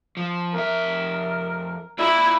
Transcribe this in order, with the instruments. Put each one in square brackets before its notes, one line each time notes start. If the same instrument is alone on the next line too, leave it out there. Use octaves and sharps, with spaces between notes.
[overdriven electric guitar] F3
[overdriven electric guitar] F2 E5 [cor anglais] A#4
[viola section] E4 [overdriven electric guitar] F4 D5